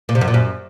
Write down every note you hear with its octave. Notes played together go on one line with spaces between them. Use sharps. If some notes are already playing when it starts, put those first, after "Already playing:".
A#2
C3
F#2
A#2
F#2